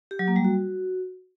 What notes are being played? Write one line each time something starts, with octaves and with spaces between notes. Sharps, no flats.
G4
F#3
A#3
G3
F#4